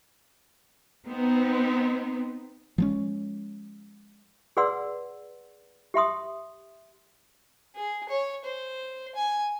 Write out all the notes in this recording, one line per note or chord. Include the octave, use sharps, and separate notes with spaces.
B3 C4 D#4
F3 G#3 C#4
G#4 B4 D5 F#5 C6 E6
G4 E5 C6 D#6
G#4
C#5
C5
G#5